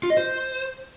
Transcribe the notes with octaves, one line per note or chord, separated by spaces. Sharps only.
F4
D#5
C5